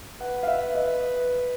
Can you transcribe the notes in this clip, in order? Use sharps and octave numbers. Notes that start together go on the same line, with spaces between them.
B4 F#5
F5
E5
D#5